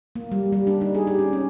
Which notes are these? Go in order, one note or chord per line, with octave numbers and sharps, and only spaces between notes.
A#3
G3
G3
D4
D#4
G#4
G4
C#4
C#4